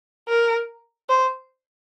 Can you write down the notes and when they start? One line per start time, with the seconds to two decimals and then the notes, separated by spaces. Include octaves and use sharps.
0.28 A#4
1.09 C5